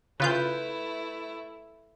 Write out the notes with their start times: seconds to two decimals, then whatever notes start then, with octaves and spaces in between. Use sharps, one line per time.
0.20 C#3 A3 E4 F4 B4 G6